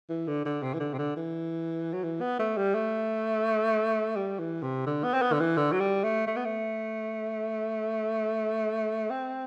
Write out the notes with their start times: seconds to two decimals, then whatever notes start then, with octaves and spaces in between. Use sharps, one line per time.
0.10 E3
0.27 D3
0.45 D3
0.63 C3
0.74 E3
0.80 D3
0.94 C3
0.98 D3
1.16 E3
1.93 F#3
2.04 E3
2.21 B3
2.39 A3
2.57 G3
2.74 A3
4.16 G3
4.39 E3
4.63 C3
4.86 D3
5.04 B3
5.14 C4
5.22 B3
5.33 D3
5.40 E3
5.57 D3
5.72 F#3
5.80 G3
6.04 A3
6.27 A3
6.36 B3
6.45 A3
9.10 C4